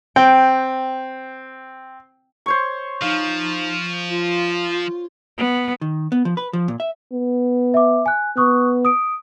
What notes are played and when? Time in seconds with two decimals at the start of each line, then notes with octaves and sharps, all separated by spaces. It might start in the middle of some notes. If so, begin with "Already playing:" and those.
0.16 C4 G5
2.46 C5 C#5 C#6
3.02 F3 D#4 F5
4.08 F4
5.37 B3
5.81 D#3
6.12 B3
6.25 F3
6.37 B4
6.53 F3
6.68 A#2
6.80 E5
7.13 B3
7.74 E5 D6
8.06 G#5 F#6
8.37 B3 C#6 D#6 F#6
8.85 D#6 D7